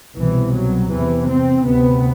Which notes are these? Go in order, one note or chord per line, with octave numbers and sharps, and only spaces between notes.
C2 B2 E3
F#3
E2 C3 E3
C4
D2 C3 B3